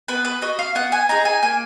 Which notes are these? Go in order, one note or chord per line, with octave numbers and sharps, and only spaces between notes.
B3 B4
B4
F#4 D#5
F5
B3 F#5
G#5
D#4 G#4 A#5
G#5
A#3 G#5